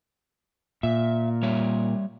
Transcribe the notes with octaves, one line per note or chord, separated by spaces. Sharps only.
A#2 E5
G3 C#5 E5